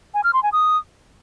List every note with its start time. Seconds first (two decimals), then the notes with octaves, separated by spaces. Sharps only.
0.14 G#5
0.24 F6
0.33 C6
0.43 G#5
0.52 D#6